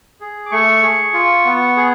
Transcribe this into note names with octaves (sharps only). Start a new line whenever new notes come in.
G#4
D6
A3 C#6
G#4
F4
B3
G#4